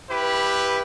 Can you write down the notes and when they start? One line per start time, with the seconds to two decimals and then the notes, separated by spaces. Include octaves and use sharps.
0.10 E4 G4 B4